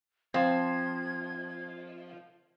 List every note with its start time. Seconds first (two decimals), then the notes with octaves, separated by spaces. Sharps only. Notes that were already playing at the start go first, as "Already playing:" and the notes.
0.34 F3 C4 C5 F5 G#6